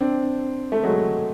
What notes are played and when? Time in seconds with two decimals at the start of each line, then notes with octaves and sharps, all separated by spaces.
0.01 C4 D4
0.72 A3
0.84 F#3 G#3